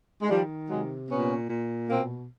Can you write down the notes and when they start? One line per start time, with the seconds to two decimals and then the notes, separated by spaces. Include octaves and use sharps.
0.22 G#3
0.30 D#3 F3 G3
0.70 C3 F#3 G#3
1.10 A#2 B3 C#4
1.50 A#2
1.90 B2 A#3 C4